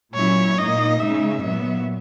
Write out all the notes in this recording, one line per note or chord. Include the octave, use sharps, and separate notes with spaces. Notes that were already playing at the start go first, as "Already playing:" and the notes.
A#2 F#3 C#4 E4 C#5
A#2 A#3 D#4 D#5
C#3 G#3 D#4 E5
A#2 F#3 B3 E5